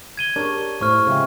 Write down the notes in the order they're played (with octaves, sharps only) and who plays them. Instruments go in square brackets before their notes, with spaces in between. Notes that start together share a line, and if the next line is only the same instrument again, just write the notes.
[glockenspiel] G#6 D#7 G7
[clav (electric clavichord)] D4 A#4 C#5 [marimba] G4 G#4 C#6
[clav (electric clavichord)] A2 [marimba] C5 [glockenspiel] C#6 F6
[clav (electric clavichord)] C#3 F3 G#3 [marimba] F4 E5 G5